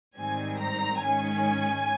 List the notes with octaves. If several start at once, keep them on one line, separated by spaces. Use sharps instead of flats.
G#2 D#3 G3 C4 G#5
A#5
G#2 D#3 G#3 C#4 G#5